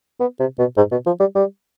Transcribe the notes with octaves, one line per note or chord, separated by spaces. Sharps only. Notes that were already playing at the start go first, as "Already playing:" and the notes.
B3
C3
B2
G#2
B2
F3
G3
G3